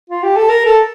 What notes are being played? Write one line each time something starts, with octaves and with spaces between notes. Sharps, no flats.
F4
G4
A4
A#4
A4